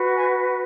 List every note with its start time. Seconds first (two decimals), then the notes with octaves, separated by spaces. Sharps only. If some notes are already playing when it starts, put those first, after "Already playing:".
Already playing: F#4 B4
0.16 G#5